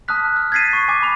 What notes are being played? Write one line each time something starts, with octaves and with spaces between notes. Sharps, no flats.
A5 D#6 F6 F#6 B6
F6
G#6 A6 B6 C7 D#7
C#6
G#5 D6
B5 F7